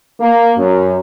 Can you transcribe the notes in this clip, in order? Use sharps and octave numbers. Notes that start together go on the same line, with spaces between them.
A#3
F#2